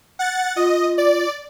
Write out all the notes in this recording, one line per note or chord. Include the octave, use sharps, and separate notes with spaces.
F#5 A6
F4 D#5
D5